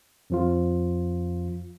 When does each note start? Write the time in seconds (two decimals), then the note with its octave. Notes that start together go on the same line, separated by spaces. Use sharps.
0.30 F2 F3 F4